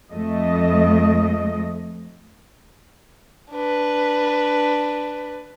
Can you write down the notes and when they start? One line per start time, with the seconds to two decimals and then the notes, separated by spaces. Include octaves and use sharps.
0.12 F2 A3 D#5
3.53 D4 B4